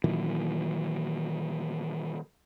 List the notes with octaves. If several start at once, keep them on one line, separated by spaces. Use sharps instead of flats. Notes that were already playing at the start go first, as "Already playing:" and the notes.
A#2 D#3 E3 F#3